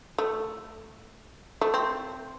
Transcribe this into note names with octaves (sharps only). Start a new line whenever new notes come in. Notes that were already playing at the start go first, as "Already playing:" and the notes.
A3
A3
C4